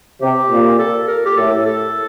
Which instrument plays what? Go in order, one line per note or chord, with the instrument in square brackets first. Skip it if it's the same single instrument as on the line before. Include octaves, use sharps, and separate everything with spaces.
[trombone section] C3 [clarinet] G4
[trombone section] A#2
[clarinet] A4
A#4
G4
[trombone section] A2 [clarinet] A4
[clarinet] A4